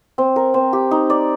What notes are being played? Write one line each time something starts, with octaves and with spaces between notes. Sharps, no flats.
C4
A#4
C4
G4
D#4
D5